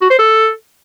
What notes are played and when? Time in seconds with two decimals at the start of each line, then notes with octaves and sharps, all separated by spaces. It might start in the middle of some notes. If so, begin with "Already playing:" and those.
0.02 F#4
0.10 C5
0.19 A4